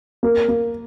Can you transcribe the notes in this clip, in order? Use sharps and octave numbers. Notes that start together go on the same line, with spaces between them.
A#3
A#3